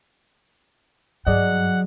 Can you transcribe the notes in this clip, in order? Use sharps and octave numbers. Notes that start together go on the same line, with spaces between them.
G2 F#3 G#4 D5 D#5 F#5